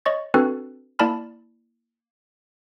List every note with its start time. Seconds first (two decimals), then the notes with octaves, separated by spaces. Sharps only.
0.06 C#5 D#5 C#6 A6
0.34 C4 D4 F#4 A4 B4
0.99 A#3 E4 D5 A5 B5 F6